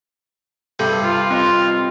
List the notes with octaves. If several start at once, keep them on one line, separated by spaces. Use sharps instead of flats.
G2 C3 A4 G6
F4
C4 D#5 C6